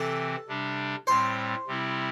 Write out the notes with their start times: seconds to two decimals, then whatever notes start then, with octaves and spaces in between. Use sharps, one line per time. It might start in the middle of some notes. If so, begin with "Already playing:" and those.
Already playing: C3 E3 C4 A4
0.48 C3 G3 D4
1.07 A2 G3 C4 C5
1.67 C3 G3 C4 E4